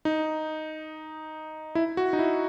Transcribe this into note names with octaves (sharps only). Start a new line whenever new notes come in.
D#4
E4
F#4
D#4
E4